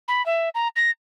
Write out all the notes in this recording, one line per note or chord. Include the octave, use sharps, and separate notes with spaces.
B5
E5
A#5
A#6